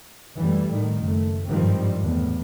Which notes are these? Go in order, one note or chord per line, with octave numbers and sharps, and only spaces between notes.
F#2 E3 G3 A3
A2 D#3
F#1 A3
G#1 G2 D#3 F3 G3 C4
E2 A2